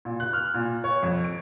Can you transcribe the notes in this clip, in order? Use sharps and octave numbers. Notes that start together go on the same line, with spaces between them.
A#2
F#6
F6
A#2
C#5
F2
D7